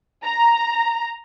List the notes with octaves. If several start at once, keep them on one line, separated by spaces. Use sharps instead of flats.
A#5